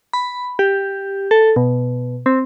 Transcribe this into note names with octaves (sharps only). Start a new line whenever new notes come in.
B5
G4
A4
B2
C4